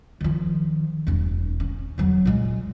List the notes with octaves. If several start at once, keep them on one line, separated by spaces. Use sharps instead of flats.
D#3 F3
E1 D4
C#4
E2 F#3
A#2 G#3